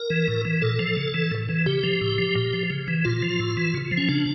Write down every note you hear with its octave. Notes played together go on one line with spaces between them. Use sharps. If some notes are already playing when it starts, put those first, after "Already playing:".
Already playing: A#4
E3
A2
E3
A#2 A4
F3
C#3
E3
A2
E3
C#3 G4
F3
A2
F3
A#2
F3
C#3
E3
A#2 F4
F3
A2
E3
C#3
F3
C#4
C#3 D4